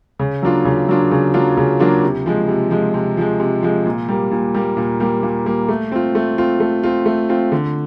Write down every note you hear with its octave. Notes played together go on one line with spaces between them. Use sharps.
C#3
F#3 A#3 D4 F4
C#3
F#3 A#3 D4 F4
C#3
F#3 A#3 D4 F4
C#3
F#3 A#3 D4 F4
C3
F3 G#3
C3
F3 G#3
C3
F3 G#3
C3
F3 G#3
A#2
G3 A#3
A#2
G3 A#3
A#2
G3 A#3
A#2
G3 A#3
A3
C4 F4
A3
C4 F4
A3
C4 F4
A3
C4 F4
D3